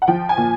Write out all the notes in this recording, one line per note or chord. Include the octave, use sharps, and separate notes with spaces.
F#5
F3 G5
G#5
A#2